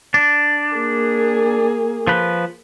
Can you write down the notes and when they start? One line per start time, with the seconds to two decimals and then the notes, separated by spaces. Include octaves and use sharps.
0.14 D4
0.75 A#3 G#4
2.07 F3 B4